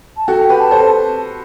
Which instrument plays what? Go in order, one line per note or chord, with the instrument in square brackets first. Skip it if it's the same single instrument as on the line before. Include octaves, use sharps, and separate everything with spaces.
[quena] A5
[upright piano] F#4 A4 [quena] G5
[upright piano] G4 B4
[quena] A5
[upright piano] A4 C5